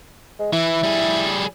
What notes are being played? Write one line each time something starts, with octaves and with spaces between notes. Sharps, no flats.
G#3
E3 E4
G3 G#4